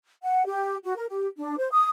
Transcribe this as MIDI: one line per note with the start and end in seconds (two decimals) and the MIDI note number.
0.23 0.44 78
0.46 0.76 67
0.83 0.95 66
0.96 1.05 70
1.09 1.26 67
1.37 1.57 62
1.58 1.69 72
1.71 1.88 87